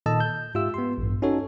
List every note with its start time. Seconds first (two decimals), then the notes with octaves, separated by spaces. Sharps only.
0.06 A#2 D#3 A4 D#5 A5 E6
0.20 G6
0.55 G#2 F4 G4 E5 E6
0.74 B3 C6
0.98 A1 G2
1.22 C#4 D#4 F#4 A4 C#5